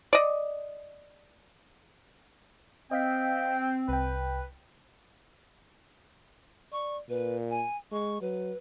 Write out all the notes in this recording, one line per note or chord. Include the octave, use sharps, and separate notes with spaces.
D5 D#5
C4 D#5 F5 G5 B6
C2 B4 G5
D5 C#6
A#2 B4
G#5
G#3 C#6
F#3 B4